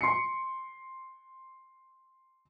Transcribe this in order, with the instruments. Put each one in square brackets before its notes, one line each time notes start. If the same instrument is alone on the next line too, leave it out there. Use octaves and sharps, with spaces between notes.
[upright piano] C6 C7 C#7